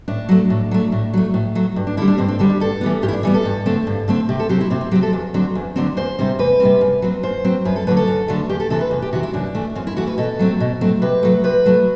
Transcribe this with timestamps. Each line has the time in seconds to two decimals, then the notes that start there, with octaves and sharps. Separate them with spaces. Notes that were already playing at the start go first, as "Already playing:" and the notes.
0.08 A2 D4
0.29 F#3 A3
0.50 A2
0.71 F#3 A3
0.92 A2
1.14 F#3 A3
1.34 A2
1.55 F#3 A3
1.76 G2
1.87 D4
1.97 D3 E4
2.02 G3
2.08 D4
2.18 G2 C4
2.28 C4
2.39 D3 G3 C4
2.50 D4
2.60 G2 A4
2.81 E3 G3 B3
3.02 G2 G4
3.08 E4
3.13 D4
3.23 E3 G3 B3
3.34 A4
3.45 G2
3.66 D3 A3 C4
3.87 G2
4.08 D3 A3 C4
4.29 C3 G4
4.39 A4
4.49 F#3 C4 G4
4.61 E4
4.70 C3 C4
4.81 C4
4.91 F#3 G4
4.95 C4
5.03 A4
5.13 E2
5.34 D3 F#3 C4
5.55 E2
5.76 D3 F#3 C4
5.97 E2 C5
6.19 C3 G3 C4
6.39 E2 B4
6.60 C3 G3 C4
6.81 F#2
7.02 F#3 C4
7.23 F#2 C5
7.44 F#3 C4
7.65 F#2 B4
7.76 A4
7.87 D3 F#3 A3 B4
7.97 A4
8.08 F#2
8.28 D3 F#3 A3
8.50 E2 G4
8.60 A4
8.70 C3 E3 A4
8.81 B4
8.91 E2
9.02 G4
9.13 C3 E3 F#4
9.23 E4
9.33 F#2 D4
9.55 E3 A3
9.75 F#2 C4
9.87 E4
9.97 E3 A3 F#4
10.07 B4
10.18 B2 A4
10.39 F#3 A3 C4
10.60 B2
10.81 F#3 A3 C4
11.02 C3 B4
11.23 F#3 A3
11.44 C3 B4
11.66 F#3 A3